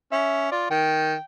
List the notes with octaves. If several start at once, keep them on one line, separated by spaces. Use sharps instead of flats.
C#4 E5
F4 D5
D#3 G5